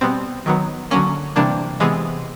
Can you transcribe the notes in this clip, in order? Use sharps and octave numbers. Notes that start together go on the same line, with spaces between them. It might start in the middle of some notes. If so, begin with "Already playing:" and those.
B2 G3 B3 C4
D#3 F#3 B3
D3 F#3 A#3 C#4
C3 E3 G3 A#3 D4
C3 E3 G#3 B3